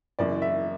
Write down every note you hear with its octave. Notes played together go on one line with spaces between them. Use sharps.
F#1 F#2 E3 D5
E5